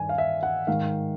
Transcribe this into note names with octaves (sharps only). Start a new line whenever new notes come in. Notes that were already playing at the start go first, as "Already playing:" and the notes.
Already playing: G2 D#3 G#5
F5
E5
F#5
G#2 D#3 F5